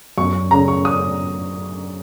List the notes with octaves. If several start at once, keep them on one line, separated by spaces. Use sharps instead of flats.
F#2 C#6
C#3 A#5
C#6
D#6